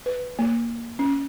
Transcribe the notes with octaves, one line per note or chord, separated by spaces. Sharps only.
B4
A#3
C#4